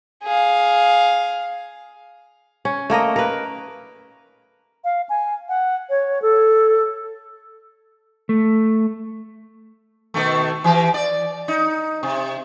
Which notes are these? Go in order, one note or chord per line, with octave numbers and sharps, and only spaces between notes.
G#4 F5
C#4
A3 A#3 A#4 D#5
A#4 B4
F5
G#5
F#5
C#5
A4
A3
B2 D#3 A3
E3 G4
D5
D#4
C3